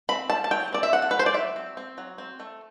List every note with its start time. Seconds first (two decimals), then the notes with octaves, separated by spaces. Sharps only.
0.09 C4 B5
0.30 G3 A5
0.44 A5
0.51 F#3 G5
0.72 C4 D5
0.83 E5
0.93 C4 F#5
1.02 A4
1.11 F#3 B4
1.19 C5
1.26 D5
1.34 F#3 E5
1.56 C4
1.77 C4
1.98 F#3
2.18 C4
2.40 A3